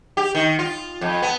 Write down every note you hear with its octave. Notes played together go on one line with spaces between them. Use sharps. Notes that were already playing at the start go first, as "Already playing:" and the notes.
G4
D#3
F4
F2
B3